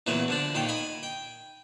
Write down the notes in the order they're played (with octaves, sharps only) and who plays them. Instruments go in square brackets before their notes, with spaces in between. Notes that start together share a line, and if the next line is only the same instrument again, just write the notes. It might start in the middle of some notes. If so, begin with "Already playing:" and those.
[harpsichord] E2 A#2 C#3 F#3 B4
D3 F3 D4
A#2 D#3 F5 G5
D#5 G#5 B5
G5